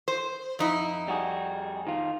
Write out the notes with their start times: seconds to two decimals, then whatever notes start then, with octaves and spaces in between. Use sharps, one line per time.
0.08 C5
0.59 F2 D#4 E4
1.08 G3 F#4 G#4
1.87 D#3 F4